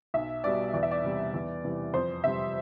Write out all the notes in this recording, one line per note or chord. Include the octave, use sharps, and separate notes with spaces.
B1 E5
B2 G3 D5
E2 D5
E5
D5
C3 G3
E2
C3 E3 G3
F2 C5
C3 G3 E5